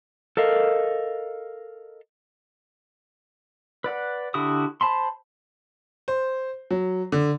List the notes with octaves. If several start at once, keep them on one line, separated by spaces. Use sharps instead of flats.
A4 A#4 D#5 F5
B4 D5 F#5
D3 E4 F#4 G4 D#6
C5 A5 B5 C6
C5
F#3
D3